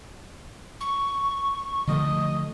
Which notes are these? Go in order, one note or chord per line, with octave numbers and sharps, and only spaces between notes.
C#6
D3 F3 A3 D#5